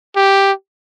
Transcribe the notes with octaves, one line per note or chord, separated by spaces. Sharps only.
G4